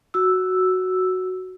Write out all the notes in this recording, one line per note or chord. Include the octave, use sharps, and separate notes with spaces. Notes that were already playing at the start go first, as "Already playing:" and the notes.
F#4 E6